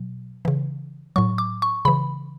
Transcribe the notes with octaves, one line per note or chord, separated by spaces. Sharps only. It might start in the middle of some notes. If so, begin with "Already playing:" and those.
Already playing: B2 F#3
C#3 E3
A2 F#3 C#6
D6
C#6
C#3 E3 B5